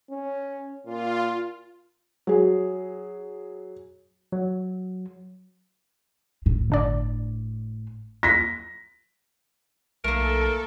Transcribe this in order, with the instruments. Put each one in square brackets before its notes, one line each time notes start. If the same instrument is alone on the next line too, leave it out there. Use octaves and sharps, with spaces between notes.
[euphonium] C#4
[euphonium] A#2 [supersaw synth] F4
[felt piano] F#3 G#4
[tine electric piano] F#3
[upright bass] A2
[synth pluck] G1 D4 D5
[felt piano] A#6 B6
[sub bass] B1 [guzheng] A3 A#3 [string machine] A4 [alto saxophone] A#4